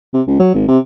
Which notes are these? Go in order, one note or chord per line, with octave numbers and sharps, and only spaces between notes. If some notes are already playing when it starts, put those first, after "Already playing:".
C3
C#2
F#3
G#1
C3